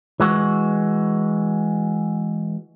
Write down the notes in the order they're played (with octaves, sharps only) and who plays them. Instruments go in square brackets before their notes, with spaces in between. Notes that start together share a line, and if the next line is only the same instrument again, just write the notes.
[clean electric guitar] E3 G#3 F#4